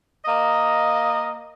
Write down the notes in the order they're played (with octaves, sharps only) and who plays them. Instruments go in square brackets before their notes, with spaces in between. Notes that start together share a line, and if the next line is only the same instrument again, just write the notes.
[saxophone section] A#3 D#5